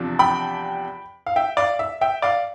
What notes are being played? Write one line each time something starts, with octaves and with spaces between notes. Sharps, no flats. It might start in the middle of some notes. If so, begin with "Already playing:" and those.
Already playing: E2 C3 F3 D4
G5 B5
F5
E5 G5
D5 F5
E5
E5 G5
D5 F5